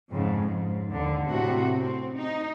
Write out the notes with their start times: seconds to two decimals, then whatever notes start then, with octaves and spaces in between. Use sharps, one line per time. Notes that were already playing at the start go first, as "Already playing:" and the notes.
0.11 F2 G#2 C#3
0.41 G#2
0.90 D#2 D3
1.27 A2 C3 F#4
1.78 C4
2.16 D#4